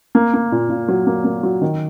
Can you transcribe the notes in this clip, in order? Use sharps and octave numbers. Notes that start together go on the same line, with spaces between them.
A#3
A#3
A#2
A#2
F#3
A#3
A#3
F#3
D#3